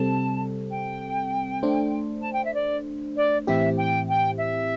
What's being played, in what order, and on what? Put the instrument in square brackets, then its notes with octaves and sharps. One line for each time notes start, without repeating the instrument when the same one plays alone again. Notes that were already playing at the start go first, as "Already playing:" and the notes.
Already playing: [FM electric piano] C3 G3 C4 A4 [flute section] A5
[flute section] G5
[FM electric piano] A3 D4 C5
[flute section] A5
G5
E5
D5
D5
[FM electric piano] A2 E3 C4 E4 G4 [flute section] E5
[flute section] G5
G5
E5